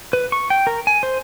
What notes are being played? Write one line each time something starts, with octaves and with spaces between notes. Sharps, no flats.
B4
C#6
G5
A#4
G#5
C5